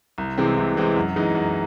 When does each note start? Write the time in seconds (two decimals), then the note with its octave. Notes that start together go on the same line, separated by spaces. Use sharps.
0.18 C2
0.38 C3 E3 G#3 C4
0.57 C2
0.77 C3 E3 G#3 C4
0.96 F#2
1.16 E3 G#3 D#4
1.35 F#2